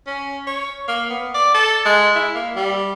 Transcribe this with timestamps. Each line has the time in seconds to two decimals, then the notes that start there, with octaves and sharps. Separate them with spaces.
0.07 C#4
0.47 C#5
0.88 A#3
1.10 B3
1.34 D5
1.54 A4
1.86 G#3
2.16 E4
2.35 A#3
2.56 G3